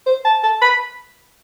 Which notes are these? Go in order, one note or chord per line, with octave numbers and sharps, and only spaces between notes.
C5
A5
A5
B5